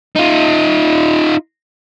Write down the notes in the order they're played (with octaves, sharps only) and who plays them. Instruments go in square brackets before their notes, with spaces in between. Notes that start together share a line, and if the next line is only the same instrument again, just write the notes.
[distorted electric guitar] D#4 F4